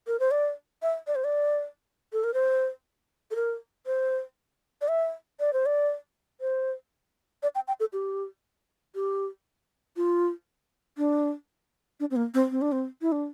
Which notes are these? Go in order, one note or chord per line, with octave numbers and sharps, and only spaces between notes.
A#4
C5
D5
E5
D5
C5
D5
A4
A#4
C5
A4
A#4
C5
D5
E5
D5
C5
D5
C5
D5
G5
G5
A4
G4
G4
F4
D4
D4
C4
A#3
C4
C4
D4
C4
E4
D4